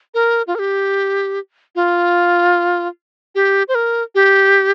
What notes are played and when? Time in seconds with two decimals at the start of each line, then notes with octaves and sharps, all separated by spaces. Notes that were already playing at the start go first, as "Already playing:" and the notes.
0.14 A#4
0.47 F4
0.55 A#4
0.59 G4
1.75 F4
3.35 G4
3.68 C5
3.75 A#4
4.15 G4